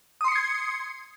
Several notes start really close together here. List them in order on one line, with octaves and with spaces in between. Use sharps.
D#6 C6 C#7 C7 G#6